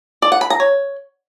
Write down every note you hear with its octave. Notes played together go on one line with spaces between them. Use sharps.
D5
F#5
B5
A#5
C#5